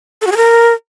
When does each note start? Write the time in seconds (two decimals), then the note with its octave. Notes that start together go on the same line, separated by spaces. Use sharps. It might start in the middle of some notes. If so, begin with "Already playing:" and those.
0.22 A4
0.27 F#4
0.32 G#4
0.37 A#4